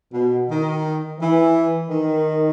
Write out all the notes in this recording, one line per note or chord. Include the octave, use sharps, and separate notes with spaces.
B2
D#3
E3
D#3